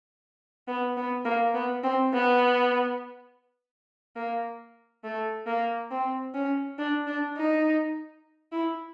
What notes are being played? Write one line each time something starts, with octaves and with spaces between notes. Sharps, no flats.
B3
B3
A#3
B3
C4
B3
A#3
A3
A#3
C4
C#4
D4
D4
D#4
E4